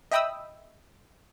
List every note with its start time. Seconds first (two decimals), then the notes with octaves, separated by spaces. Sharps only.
0.12 D#5 E5 G5 B5 D#6 E6